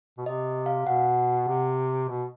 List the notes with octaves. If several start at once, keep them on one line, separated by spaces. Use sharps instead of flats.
B2
C3 D#5
F5
B2 F#5
C3
B2